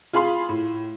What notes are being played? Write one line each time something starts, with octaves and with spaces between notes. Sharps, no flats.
F4 G#4 F5 B5 C6
A2